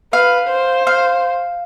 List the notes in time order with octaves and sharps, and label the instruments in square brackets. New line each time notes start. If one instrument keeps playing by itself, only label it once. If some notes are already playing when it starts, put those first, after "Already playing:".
[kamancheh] B4 [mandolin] F5
[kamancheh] C5
[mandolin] F5